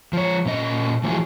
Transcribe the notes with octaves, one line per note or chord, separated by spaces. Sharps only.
F3 C#5
A#2 C#4 D#5
E3 F3 A3 F#4 G#4